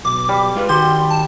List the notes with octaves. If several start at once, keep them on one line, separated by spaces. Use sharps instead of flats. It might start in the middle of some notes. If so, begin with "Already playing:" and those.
B1 D6
G3
G#3 F4 B4
D#3 F#4 G4 C6
A5